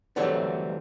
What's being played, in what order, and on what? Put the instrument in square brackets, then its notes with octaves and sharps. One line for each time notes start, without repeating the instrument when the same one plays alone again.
[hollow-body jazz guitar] D3 E3 F#3 G3 A3 C4